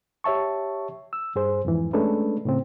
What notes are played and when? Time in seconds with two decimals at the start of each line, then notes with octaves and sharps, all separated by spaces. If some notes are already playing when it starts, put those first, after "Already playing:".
0.24 G4 C#5 E5 A5 C#6
1.13 E6
1.36 G2 G#4 C5
1.65 F2 G#2 E3
1.93 G#3 A3 C#4 D4 A4 B4
2.45 A2 C#3 C4